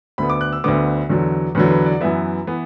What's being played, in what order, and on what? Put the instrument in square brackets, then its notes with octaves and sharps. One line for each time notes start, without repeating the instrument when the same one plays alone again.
[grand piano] D2 D3 B3 B5
D6
F#6
E6
D2 D3 B3 D6
E2 D3 F#3
E2 D3 F#3 B4
B4
D5
F#2 E3 B3 E5
E3 B3